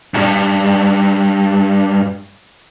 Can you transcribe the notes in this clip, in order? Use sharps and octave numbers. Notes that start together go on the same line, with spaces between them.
B1 G2